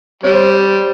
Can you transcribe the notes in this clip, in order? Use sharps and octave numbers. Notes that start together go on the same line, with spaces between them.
C3 G3 C#5
C5